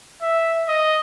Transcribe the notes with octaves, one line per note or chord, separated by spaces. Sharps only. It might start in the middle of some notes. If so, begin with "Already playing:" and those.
E5
D#5